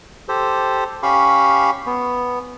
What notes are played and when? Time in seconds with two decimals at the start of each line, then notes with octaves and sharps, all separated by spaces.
0.29 G4 A4 C5
1.03 C#4 G4 F5 B5 C#6
1.86 B3